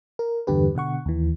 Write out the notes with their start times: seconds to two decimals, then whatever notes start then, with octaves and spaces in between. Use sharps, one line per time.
0.19 A#4
0.47 E2 G2 D3 G4 B4
0.75 B2 D3 F#5 C#6
1.06 D#2 E3